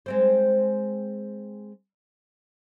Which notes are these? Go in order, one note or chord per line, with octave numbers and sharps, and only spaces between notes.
G#3 C4 C5